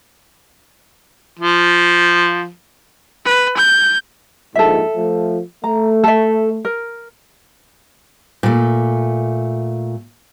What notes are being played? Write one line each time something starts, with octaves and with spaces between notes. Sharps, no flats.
F3
B4
G6
A#1 G#2 A4 E5
F3 A3
A3 A#5
A4 E5
A#4
A#2 A3